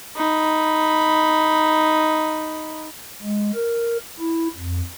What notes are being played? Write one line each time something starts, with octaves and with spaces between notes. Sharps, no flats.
D#4 B5
G#3
A#4
E4
F2